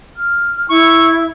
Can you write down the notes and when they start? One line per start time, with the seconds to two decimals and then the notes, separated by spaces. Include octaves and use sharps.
0.16 F6
0.69 E4 C#6